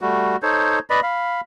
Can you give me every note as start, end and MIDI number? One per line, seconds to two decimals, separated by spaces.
0.01 0.36 55
0.01 0.36 57
0.01 0.36 66
0.43 0.79 63
0.43 0.79 69
0.43 0.79 72
0.43 0.79 73
0.90 1.01 71
0.90 1.01 74
0.90 1.01 75
0.90 1.01 83
1.03 1.41 77
1.03 1.41 83